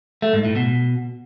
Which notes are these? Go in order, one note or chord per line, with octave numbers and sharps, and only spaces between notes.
A3
G#2
A2
B2